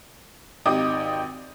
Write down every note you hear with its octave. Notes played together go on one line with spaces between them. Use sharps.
G#1 D#4 G4 D6 D#6